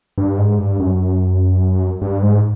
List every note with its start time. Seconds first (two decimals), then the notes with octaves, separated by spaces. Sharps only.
0.18 G2
0.38 G#2
0.58 G2
0.80 F#2
2.02 G2
2.22 G#2